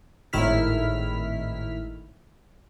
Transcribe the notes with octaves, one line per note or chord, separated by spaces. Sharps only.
G#1 A2 D#3 E4 F6 B6